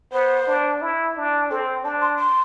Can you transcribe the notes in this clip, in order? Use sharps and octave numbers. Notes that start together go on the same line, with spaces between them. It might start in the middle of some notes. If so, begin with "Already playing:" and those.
B3 C5
D4
E4
D4
C4 A4
D4 A5
C6
C6